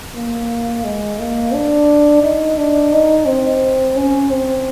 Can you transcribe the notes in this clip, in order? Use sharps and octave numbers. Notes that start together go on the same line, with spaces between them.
A#3
G#3
A#3
D4
D#4
D4
D#4
C4
C#4
C4